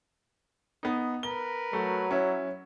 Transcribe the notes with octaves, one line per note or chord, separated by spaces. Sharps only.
B3 D#4
A#4 B4 G7
F#3 A3
C#4 E4